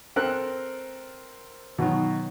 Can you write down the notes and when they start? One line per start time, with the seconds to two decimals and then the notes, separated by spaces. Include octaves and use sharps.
0.16 C4 A4 A#4 F#6
1.78 B2 D#3 F#3